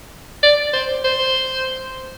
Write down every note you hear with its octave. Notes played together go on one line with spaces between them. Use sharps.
D5
C5
C5